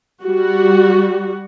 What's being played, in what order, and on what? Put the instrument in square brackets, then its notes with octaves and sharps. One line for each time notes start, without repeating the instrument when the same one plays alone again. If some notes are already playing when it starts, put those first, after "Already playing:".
[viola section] G3 F#4